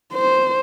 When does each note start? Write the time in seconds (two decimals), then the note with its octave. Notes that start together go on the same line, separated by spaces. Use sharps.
0.13 C5